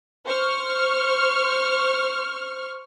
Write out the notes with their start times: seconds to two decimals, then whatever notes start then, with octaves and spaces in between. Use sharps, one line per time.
0.25 C5 C#6 F6